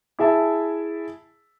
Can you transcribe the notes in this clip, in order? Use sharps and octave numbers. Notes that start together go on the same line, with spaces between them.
E4 G#4 E5 A5